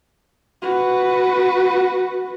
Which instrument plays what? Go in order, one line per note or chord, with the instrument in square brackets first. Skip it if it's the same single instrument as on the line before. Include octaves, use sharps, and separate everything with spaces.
[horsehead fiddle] F#4 B4